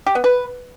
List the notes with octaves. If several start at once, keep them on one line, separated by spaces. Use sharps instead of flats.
G4
B3
B4